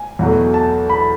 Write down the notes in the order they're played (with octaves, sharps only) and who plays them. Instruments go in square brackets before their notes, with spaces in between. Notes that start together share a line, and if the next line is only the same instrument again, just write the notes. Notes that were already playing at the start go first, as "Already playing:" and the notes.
Already playing: [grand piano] G#5
E2 B2 F#3 A3
A5
B5